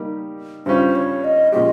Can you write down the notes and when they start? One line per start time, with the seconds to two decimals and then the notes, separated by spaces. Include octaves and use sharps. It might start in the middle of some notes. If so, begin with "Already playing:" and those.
Already playing: G3 A#3 D#4 G4 A#4
0.66 G2 G3 C#4 F4 C5
0.95 C#5
1.24 D#5
1.52 A#2 F3 G#3 C#4 G4 D#5